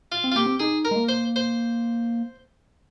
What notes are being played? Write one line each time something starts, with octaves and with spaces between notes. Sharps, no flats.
F4
C4
F4
A#3 G4
C4
D#4 G#4
A#4
G#3
A#3
C5
C5